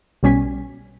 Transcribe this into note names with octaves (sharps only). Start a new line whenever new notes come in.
B1 B2 G3 C#4 G#5 B6